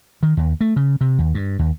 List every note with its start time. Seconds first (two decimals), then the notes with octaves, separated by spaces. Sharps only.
0.23 D#3
0.37 D#2
0.61 A3
0.76 C#3
1.01 C3
1.19 D#2
1.34 G2
1.59 D#2